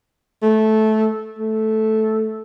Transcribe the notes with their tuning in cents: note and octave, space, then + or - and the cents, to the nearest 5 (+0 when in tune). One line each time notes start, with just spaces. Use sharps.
A3 -15
A3 -10